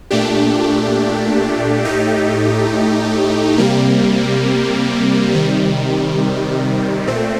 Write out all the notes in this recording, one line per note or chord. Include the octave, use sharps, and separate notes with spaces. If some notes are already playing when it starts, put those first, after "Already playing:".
A#2 A3 D4 G4
A2 A3 D#4 G4
C3 G3 A#3
C3 D#3 G3
A#2 A3 C4